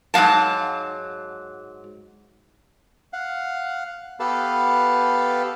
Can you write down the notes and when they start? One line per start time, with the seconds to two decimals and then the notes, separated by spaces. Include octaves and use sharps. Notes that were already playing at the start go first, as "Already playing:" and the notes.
0.14 G#2 F#3 A#3 F5 A5
3.13 F5 F#5
4.20 B3 G4 A4 B4 F5 A5